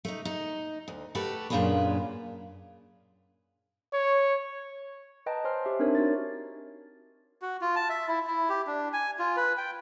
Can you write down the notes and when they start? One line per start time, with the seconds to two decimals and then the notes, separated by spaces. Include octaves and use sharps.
0.05 A3 D#4
0.25 D#4
0.88 D2
1.15 A3 F#4 G4 A4 B4
1.50 F#2 A#2 D4 F4 G#4 B4
3.94 C#5
5.26 B4 D#5 G5 A5 A#5
5.45 C5 C#5 G#5 C6 F6
5.65 G4 E5
5.79 C4 D4 D#4 A#4 C#5
5.95 F#4 C#5 A6
7.42 F#4
7.61 F4
7.76 A5
7.89 E5
8.08 E4
8.27 E4
8.49 G4
8.67 D4
8.93 G#5
9.19 F4
9.37 B4
9.58 G5